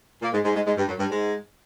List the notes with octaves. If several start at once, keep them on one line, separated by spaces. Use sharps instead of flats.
A#2 A#3
G#2 G#3
G#2 G#3
G#2 G#3
G#2 G#3
G2 G3
F#2 F#3
G2 G3
G#2 G#3